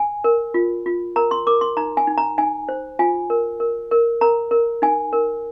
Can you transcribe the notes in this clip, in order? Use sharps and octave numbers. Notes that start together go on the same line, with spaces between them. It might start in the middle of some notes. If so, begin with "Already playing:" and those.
Already playing: G#5
A#4
F4
F4
A#4 A#5
C6
A#4 D6
C6
D#4 A#5
G#5
D#4
A#5
D#4 G#5
C5
F4 G#5
A#4
A#4
A#4
A#4 A#5
A#4
D#4 G#5
A#4